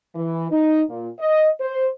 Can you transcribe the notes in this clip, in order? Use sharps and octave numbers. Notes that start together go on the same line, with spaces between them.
E3
D#4
A#2
D#5
C5